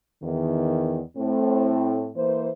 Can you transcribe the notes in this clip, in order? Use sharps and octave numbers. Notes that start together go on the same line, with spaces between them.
E2 D#3
A2 C4
E3 A#3 C5